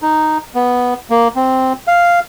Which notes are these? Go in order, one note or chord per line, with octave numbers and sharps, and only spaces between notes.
D#4
B3
A#3
C4
F5